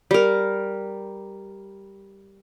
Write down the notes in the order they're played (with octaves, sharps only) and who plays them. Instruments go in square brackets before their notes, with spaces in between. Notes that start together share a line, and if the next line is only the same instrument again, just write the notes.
[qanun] G3 A#4